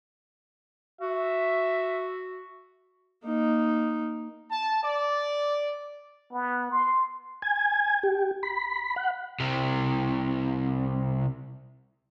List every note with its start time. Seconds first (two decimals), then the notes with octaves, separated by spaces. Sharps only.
1.01 F#4 E5
3.25 A#3 D#4
4.50 A5
4.82 D5
6.33 B3
6.72 C6
7.42 G#5
8.03 G4
8.43 B5
8.96 F#5
9.40 C2 C3